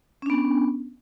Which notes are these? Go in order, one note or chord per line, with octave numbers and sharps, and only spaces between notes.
B3 C#4 D4